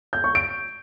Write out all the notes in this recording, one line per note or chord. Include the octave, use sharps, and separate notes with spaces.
G6
C#6
D7